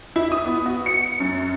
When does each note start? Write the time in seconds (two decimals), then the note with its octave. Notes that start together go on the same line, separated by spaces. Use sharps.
0.16 E4
0.32 D#6
0.46 B3
0.66 F#4
0.86 C#7
1.20 F#2